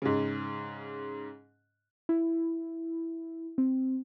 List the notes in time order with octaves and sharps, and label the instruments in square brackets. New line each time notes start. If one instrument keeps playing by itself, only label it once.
[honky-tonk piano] G#2 C#3
[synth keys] E4
C4